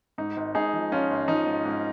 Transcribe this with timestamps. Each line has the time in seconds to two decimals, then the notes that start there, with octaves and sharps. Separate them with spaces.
0.18 G#2 D#4
0.37 G#1
0.55 G#1 D#4 G#4
0.73 F3
0.92 F3 C#4 F4
1.10 G#1
1.28 F3 D#4
1.47 G#1
1.65 G#2